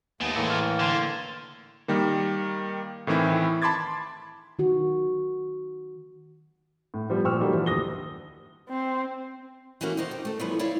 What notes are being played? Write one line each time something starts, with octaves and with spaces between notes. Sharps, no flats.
D#2 G#3 A3 B3 D7
A2 E3 A#3 A5 E6 C#7
C#6 F6 A6
D3 C6 G#6 C7
D#3 G3 A#3
A2 D#3 E3 C4 E4
A5 B5 C6 D6 G#6 A6
D#3 F#4
A2
F3 G3 B3
A#2 F3 G5 C#6 E6 F6
D#3 F#3 G3 A3 A#3
E3 F3
D2 G4 D#6 A#6 G7
C4
E3 A3 A#3 C#4 F#4
D#2 D#3 D#4 C5
G4
A3 A4
C#3 E3 F3 G3 B3
E4 C#5 D5 F5